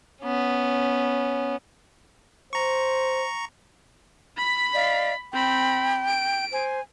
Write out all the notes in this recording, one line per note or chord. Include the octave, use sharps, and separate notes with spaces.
B3 C#4
C5 A#5 C#6
B5 B6
D5 D#5 F5
C4 G5 B5
D7
C5 G#5